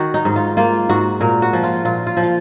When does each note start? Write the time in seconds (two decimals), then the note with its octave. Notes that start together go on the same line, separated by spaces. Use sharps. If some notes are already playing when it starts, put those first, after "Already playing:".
Already playing: D#3 F#4
0.14 D#4
0.25 G#2
0.36 F4
0.57 A#3 F4
0.89 G#2 F#4
1.21 A#2 A#4
1.42 F#4
1.53 F3
1.64 F4
1.85 A#2 F4
2.07 F4
2.17 F3
2.23 F4